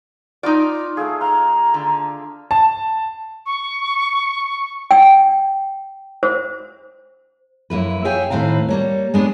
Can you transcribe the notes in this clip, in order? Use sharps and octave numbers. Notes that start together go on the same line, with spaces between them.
D#4 F4 D5 D6 D#6
A3 G#4 F5
F5 A#5 C6
D3
A5
C#6
G5
C5
F#2 A#3 E4 B4
G#4 C#5 E5 F5 G5 G#5
D#2 A2 C4 B4 F5 A#5
G3 A#3 C#5
G#3 B3 D4 G#4 C#5